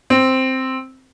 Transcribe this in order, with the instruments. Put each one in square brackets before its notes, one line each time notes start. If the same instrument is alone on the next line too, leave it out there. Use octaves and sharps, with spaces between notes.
[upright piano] C4